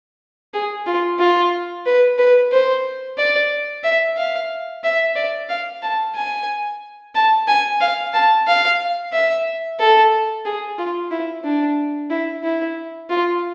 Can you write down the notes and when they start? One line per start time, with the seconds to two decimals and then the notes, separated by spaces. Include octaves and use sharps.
0.54 G#4
0.87 F4
1.19 F4
1.86 B4
2.19 B4
2.52 C5
3.18 D5
3.83 E5
4.17 F5
4.84 E5
5.16 D5
5.49 F5
5.82 A5
6.15 G#5
7.15 A5
7.48 G#5
7.80 F5
8.14 A5
8.47 F5
9.13 E5
9.80 A4
10.45 G#4
10.78 F4
11.11 E4
11.44 D4
12.10 E4
12.44 E4
13.09 F4